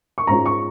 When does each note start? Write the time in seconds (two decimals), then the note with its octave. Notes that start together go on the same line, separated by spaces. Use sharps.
0.18 C#6
0.27 G#2 G#3 C#4 F4 A#5
0.46 C#6